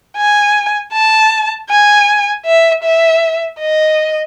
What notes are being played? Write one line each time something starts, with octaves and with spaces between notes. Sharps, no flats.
G#5
A5
G#5
E5
E5
D#5